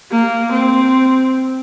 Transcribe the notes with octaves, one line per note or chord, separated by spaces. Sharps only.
A#3
C4